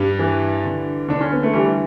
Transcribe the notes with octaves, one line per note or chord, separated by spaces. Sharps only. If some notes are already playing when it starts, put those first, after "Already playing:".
Already playing: G2 G3
E3
D3
D3 D4
C#4
B3
A3
E3 G3